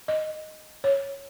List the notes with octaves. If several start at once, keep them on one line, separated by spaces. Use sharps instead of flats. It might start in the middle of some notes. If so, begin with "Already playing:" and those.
D#5
C#5